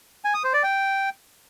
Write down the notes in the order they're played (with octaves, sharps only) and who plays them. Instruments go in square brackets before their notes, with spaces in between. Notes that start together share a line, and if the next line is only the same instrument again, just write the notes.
[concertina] G#5
D#6
C5
D5
G5